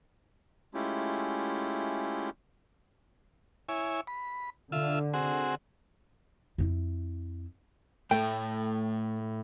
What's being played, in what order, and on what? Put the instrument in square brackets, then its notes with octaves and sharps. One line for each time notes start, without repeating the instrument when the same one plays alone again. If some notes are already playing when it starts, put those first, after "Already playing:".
[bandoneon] G#3 A3 C#4 E4 F4 G4
[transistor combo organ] E4 C#5 G#5
B5
[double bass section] D3 [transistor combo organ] F4 E5
[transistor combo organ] C4 F#4 G#4
[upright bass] F2 E4
[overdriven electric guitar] A2 [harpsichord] A3 [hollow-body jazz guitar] G5